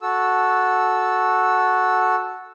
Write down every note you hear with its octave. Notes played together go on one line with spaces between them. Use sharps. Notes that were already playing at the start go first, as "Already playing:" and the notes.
F#4 A4 E6